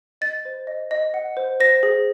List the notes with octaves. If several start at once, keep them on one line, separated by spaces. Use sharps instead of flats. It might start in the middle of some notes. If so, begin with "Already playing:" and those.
D#5 A6
C5
D#5
D#5
F#5
C5
C5 A#6
G#4